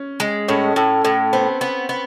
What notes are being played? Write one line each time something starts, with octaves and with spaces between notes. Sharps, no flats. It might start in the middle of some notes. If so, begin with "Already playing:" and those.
Already playing: C#4
G#3
A2 C#4
A2
A2
B3 C4
B3
B3